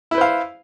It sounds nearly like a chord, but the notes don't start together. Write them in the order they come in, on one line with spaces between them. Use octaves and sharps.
E4 B4 C5 F5